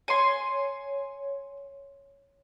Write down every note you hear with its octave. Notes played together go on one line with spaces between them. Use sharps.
C#5 G#5 C6